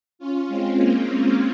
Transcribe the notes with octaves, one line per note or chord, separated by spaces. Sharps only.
C#4 F4
G#3 C4
A#3 C#4
A#3 C#4